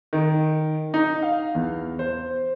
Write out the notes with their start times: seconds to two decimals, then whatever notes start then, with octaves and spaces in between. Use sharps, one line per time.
0.13 D#3
0.94 D#4
1.22 F5
1.55 E2
1.99 C5